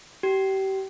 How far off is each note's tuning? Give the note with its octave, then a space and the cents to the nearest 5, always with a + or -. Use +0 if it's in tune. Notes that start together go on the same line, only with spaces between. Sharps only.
G4 -30